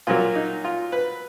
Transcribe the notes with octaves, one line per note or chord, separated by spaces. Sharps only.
A#2 F#3 A#3 F4
D#4
F4
B4